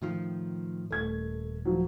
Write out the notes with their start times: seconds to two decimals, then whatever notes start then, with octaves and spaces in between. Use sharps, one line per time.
0.02 A2 D#3 F3
0.91 D#1 A3 G#6
1.65 F3 F#3